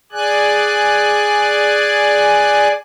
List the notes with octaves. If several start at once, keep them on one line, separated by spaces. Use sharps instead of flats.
G#4 D5 G#5 F#6